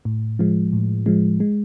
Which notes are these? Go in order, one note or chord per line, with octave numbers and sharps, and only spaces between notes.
A2
F3 G#3
A2
F3 G#3
G#3